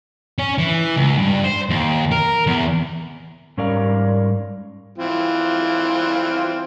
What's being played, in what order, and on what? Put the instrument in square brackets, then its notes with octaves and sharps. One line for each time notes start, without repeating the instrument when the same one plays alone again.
[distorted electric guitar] C#4
E3
C#2
G2
C5
D#2
A#4
E2
[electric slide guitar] G#2 G3 C#4 A#4 D5 F5
[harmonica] E3 C4 F4